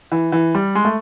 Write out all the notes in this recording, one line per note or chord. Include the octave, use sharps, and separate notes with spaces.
E3
E3
G3
G#3
A3